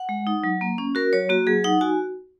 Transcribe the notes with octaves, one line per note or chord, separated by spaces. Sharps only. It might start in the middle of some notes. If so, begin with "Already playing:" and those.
Already playing: F#5
G#3
D#4
F#3
A#3
C#4
F#4 A#4
F#3 C#5
A#3 F#4
F#3 G#4
D#4 F#5
F#4 G#5